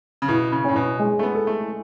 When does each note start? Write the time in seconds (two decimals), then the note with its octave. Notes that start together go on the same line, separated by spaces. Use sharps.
0.22 C#3
0.28 B2 E4
0.52 C#3
0.64 A2 C#4
0.76 B2
0.99 G#3
1.19 A3
1.23 B3
1.35 A4
1.47 A3